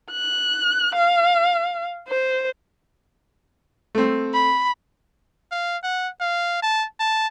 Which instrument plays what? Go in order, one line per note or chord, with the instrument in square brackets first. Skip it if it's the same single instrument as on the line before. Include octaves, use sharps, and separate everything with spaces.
[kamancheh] F#6
F5
C5
[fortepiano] A3 C4
[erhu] B5
[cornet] F5
F#5
F5
A5
A5